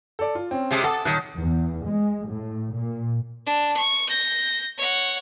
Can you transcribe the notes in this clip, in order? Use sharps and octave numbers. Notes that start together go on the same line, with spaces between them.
A4 D5
F4
C4 C#4
C3 G#3
A4 F#5 D6 D#6
D#1 D#3 F#6
E2
G#3
A2
A#2
D4
C#6
G6 A#6
C#5 F#5